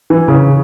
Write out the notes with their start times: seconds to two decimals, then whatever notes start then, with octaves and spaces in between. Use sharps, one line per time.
0.10 E3
0.28 C#3